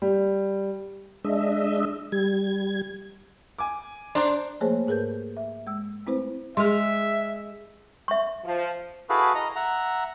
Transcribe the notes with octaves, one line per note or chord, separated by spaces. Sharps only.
G3
G#3 D4 D#5 E5
G3 G#6
G#5 D6
D4 C5 A#5 C6
F3 A3 A#3 G#4 C5 C#5
G#2 G#4 A#4 B4 G6
E5
G#3 E6
A3 C4 E4 B4 C5
G#3 G#4 E5 C6
E5 C#6
F3
E4 F#4 G#4 A4 B4 F5
D#5 A#5
E5 F#5 A#5